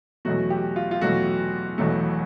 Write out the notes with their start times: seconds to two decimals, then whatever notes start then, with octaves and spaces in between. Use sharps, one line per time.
0.25 E2 B2 F#3 A3 F#4
0.50 G4
0.76 F4
0.91 F4
1.01 E2 B2 F#3 A3 F#4
1.78 E1 E2 B2 F#3 A3